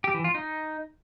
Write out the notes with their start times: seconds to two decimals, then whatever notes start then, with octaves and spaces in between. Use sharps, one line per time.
0.04 G4
0.14 E3
0.24 F4
0.35 D#4